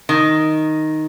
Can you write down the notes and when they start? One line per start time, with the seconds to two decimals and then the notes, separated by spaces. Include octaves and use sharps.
0.09 D#3